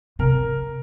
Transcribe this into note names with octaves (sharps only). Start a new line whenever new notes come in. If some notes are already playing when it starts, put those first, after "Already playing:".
C3 A#4